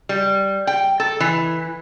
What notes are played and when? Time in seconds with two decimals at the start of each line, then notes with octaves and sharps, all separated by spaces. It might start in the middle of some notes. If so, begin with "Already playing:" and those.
0.09 G3
0.67 G5
1.00 A4
1.20 E3